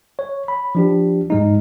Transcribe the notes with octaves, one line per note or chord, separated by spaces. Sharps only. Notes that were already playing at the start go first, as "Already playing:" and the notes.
C#5
B5
F3 D4 G4
G#2 G#3 D#4